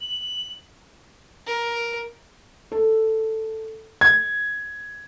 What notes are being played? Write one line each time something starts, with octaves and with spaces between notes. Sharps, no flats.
F#7
A#4
A4
G#6